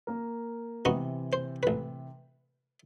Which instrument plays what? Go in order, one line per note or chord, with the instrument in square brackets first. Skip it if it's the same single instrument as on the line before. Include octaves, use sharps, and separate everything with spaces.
[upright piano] A#3 A#4
[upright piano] C3 E3 [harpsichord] B3 D#4 F#4
[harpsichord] C5
A1 B4